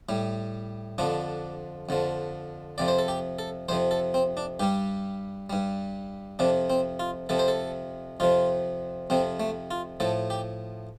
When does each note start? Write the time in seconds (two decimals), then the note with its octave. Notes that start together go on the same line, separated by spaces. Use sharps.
0.09 A2 G3
0.98 F2 D3 F3 D4
1.89 F2 D3 F3
2.78 F2 C3 F3 D5
2.88 C5
2.99 A4
3.08 G4
3.39 A4
3.69 F2 C3 F3 C5
3.91 A4
4.14 C4
4.37 D4
4.60 G2 G3 G4
5.50 G2 G3
6.39 F2 C3 F3 D4
6.70 C4
6.99 F4
7.29 F2 C3 F3 A4
7.39 C5
7.48 A4
8.20 F2 C3 F3 F4
9.10 F2 C3 F3 C4
9.40 A3
9.71 F4
10.00 A2 F3 A4
10.30 G4